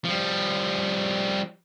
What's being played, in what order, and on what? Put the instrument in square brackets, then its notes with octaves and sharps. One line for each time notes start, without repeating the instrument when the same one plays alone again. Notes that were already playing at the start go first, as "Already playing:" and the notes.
[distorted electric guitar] F3 G3